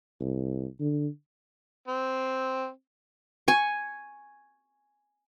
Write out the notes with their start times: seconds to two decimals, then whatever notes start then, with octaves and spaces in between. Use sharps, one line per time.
0.20 C2
0.80 D3
1.88 C4
3.48 G#5 C#6